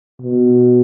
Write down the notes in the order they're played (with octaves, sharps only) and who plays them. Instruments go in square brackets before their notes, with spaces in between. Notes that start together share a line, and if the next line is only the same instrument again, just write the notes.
[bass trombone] B2